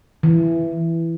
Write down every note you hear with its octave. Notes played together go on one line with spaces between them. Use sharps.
E3